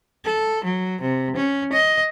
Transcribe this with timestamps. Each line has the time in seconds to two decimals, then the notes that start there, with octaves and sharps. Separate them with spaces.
0.24 A4
0.64 F#3
1.01 C3
1.36 C#4
1.73 D#5